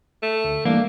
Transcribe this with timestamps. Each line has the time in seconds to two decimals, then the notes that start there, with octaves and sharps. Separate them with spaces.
0.23 A3
0.45 D2
0.65 E3 G3 A3 A#3 D4